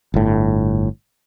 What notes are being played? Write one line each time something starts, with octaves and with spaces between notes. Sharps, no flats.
G1 A2